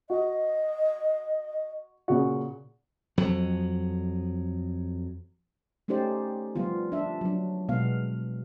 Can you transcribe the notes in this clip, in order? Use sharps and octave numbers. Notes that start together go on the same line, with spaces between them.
F#4 D#5
A#2 C#3 F#4
F2 F#3
A3 C#4 D#4 G4 C5 D5
F3 G3 B3 F4
D4 E5
F#3 D4
B2 G#3 B3 F5